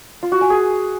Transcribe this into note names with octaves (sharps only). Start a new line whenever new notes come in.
F4
F#4
G#5
G#4